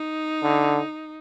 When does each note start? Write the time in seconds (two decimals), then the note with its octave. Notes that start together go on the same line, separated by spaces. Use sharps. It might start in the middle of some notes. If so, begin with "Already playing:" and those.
Already playing: D#4
0.43 D3